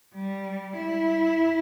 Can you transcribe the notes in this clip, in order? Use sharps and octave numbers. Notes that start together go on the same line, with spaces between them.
G3
E4